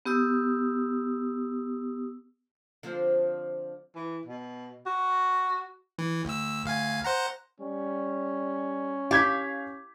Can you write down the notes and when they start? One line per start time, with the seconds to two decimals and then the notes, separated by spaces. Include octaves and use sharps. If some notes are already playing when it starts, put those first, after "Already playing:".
0.05 B3 G4 D#6 E6
2.83 D3 F3 C4
3.95 E3
4.26 B2
4.86 F#4
5.99 E3
6.25 D2 E6
6.64 D2 F5 G#5
7.04 C5 F#5 A#5
7.60 G3 C#4
9.11 G4 F5 G#6 B6